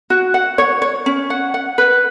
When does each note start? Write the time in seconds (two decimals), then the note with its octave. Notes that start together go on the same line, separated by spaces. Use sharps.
0.10 F#4
0.34 F#5
0.58 C#5
0.82 C#5
1.06 C#4
1.30 F#5
1.54 F#5
1.78 B4